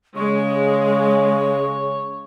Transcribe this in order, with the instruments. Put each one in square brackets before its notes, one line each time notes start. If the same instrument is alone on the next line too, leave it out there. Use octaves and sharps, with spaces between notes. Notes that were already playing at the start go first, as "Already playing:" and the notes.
[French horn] C#3 [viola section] G#3 [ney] G#4 [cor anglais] C#5